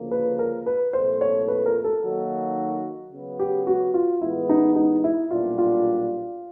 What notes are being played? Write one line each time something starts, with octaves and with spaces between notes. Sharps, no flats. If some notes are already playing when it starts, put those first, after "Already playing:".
Already playing: D2 C#3 F3 A#3
B4
A#4
B4
C2 A#2 F3 A3 C5
C#5
B4
A#4
A4
D#3 F#3 A#3 D#4 F#4
C#3 F#3 B3
G4
F#4
F4
A2 E3 G#3 B3 E4
D#4
D#4
E4
B1 A#2 G3 B3 D4 F4
F4